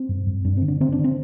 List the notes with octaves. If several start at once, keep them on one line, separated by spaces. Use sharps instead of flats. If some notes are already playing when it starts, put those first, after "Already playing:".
Already playing: C4
G2
G2
G2 D4
D3 C4
D4
D3 C4
D4
D3
C4